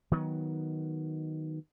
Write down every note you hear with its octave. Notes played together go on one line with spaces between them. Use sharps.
D#3 F#3 B3